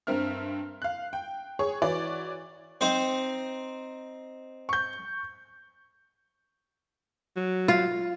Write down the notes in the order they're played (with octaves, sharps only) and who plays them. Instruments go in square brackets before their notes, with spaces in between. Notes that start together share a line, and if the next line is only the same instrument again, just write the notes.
[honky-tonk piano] G2 C4 A#4 E5 F6
F5 F#6
G5
G#4 C#5 C#6
E3 F#4 C#5 D5
[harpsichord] C4 D#4 C5
[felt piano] C#6 G6
[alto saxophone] F#3
[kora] F4